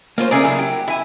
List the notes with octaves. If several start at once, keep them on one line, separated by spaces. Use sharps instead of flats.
A#3 C#4 F4 C5
C#3 A3 C#4 G#4 A#4 D5
F#3 E4
G4
E4 E5 G#5